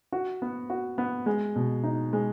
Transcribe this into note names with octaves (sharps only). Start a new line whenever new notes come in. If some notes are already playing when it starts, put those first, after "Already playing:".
F#4
B3
F#4
B3
G#3
B2
D#4
G#3